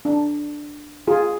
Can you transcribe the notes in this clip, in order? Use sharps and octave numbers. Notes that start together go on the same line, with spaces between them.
D4
F4 G#4